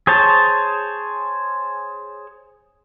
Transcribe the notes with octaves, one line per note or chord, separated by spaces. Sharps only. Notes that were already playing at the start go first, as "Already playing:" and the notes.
G#4 C5 C#5 A5